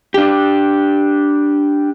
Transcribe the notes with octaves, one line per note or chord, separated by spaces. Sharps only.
D4 G4